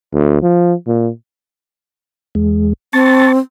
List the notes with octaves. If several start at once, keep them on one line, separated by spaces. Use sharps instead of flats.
D2
F3
A#2
E2 G#3
C4 A5 C#6 A6